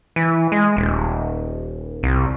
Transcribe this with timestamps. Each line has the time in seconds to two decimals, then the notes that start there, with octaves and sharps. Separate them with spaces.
0.16 E3
0.52 G#3
0.77 D#1
2.03 C2